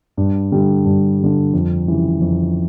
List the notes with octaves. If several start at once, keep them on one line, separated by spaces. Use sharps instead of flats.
G2
D3 G3
G2
D3 G3
F2
C#3 E3 G3
F2